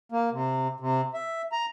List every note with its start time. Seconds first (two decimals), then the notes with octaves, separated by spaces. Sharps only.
0.12 A#3
0.32 C3
0.80 C3
1.14 E5
1.52 A#5